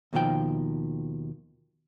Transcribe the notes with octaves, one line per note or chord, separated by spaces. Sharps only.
D#2 B2 D#3 F3 G5